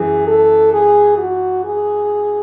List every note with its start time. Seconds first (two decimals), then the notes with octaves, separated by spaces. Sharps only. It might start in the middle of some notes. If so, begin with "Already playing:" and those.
Already playing: F#2 E3 G#4
0.27 A4
0.73 G#4
1.18 F#4
1.65 G#4